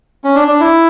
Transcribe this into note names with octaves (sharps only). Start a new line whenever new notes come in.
C#4
D4
D4
E4